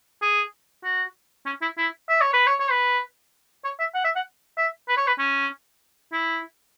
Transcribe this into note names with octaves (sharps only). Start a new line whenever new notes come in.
G#4
F#4
C#4
E4
E4
E5
C#5
B4
C#5
C#5
B4
C#5
E5
F#5
E5
F#5
E5
B4
C#5
B4
C#4
E4